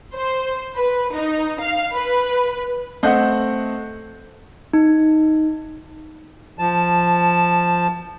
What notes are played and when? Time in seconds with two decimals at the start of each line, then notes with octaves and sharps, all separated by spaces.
0.16 C5
0.76 B4
1.14 D#4
1.61 F5
1.92 B4
3.03 A3 C4 D#5 F#5 G6
4.73 D#4
6.59 F3 A5